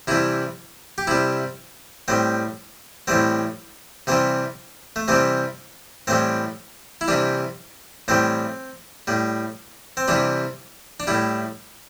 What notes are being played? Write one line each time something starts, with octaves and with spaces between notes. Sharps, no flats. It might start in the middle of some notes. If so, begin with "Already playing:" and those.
C3 E3 G3 E4
G4
C3 G3 E4
A2 G3 C4
A2 E3 G3 C4
C3 E3 G3 C4
A3
C3 E3 G3 C4
A2 E3 G3 C4
E4
C3 E3 G3 D4
A2 E3 G3 C4
A2 G3
C4
C3 E3 G3 D4
D4
A2 G3 E4